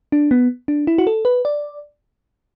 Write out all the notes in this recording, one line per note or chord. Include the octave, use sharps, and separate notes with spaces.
D4
B3
D4
E4
F#4
A4
B4
D5